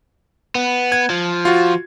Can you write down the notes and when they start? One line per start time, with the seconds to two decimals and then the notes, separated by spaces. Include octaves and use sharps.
0.55 B3
0.92 G#6
1.10 F3
1.45 F4 F#4